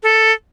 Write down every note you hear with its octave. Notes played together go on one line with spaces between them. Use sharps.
A4